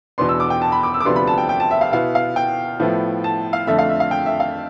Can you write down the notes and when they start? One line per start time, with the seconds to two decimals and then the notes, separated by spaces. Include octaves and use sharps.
0.18 E2 B2 B3 D4 C6
0.29 E6
0.40 D6
0.50 G5
0.62 A5
0.72 B5
0.83 D6
0.94 E6
1.00 D6
1.05 D2 C3 F3 B3 D4 C6
1.16 B5
1.27 A5
1.38 G5
1.49 G5
1.60 A5
1.71 E5
1.81 F5
1.92 B2 B3 E4 F5
2.15 F5
2.36 G5
2.80 A2 F3 B3 E4
3.24 A5
3.53 F5
3.67 F2 D3 A3 E5
3.79 F5
3.89 E5
4.00 F5
4.11 G5
4.26 E5
4.40 F5